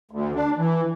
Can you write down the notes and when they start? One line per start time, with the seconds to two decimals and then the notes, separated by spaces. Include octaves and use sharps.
0.11 D2
0.35 D4
0.57 E3